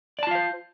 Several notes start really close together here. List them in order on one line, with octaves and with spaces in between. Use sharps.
D5 A5 F4 F5 C5